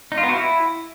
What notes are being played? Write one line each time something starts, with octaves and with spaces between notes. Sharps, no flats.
D#4
F4
B3
F#4
E4